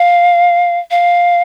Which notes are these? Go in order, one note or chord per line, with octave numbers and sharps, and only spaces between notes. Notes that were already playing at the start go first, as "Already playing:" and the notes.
Already playing: F5
F5